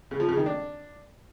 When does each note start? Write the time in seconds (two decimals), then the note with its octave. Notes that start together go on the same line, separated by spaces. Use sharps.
0.11 C#3
0.20 F3
0.29 C#3
0.37 D#3
0.46 D4